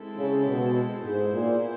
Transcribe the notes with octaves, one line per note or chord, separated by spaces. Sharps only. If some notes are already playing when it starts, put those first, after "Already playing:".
Already playing: G#3 C4 E4 A4
C#3
B2
G#2 B3 E4 G#4 C5
A#2